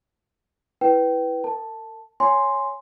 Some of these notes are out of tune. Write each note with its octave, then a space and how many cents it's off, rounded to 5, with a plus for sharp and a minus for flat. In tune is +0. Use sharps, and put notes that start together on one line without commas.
E4 +0 B4 +0 G5 -20
A#4 -45 A5 +0
C#5 +0 G#5 +0 C6 +0